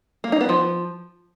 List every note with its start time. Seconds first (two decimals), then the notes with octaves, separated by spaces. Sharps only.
0.24 A#3
0.32 D#4
0.41 B3
0.49 F3